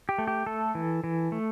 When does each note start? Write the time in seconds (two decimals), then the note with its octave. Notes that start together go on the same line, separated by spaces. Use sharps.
0.09 G4
0.18 A3
0.27 G4
0.46 A3 A4
0.75 E3
1.04 E3
1.32 A3